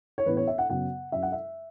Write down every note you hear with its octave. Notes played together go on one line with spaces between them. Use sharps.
C#5
A1 A2 E3 B3 B4
C#5
E5
F#5
F#2 C#3 F#3 B3 F#5
F#2 F#3 C#4 E5
F#5
E5